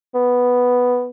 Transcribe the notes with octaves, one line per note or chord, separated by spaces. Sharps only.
B3